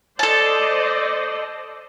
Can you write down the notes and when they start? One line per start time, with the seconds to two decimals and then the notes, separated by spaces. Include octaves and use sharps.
0.19 A4 C5 D5 D#5 A5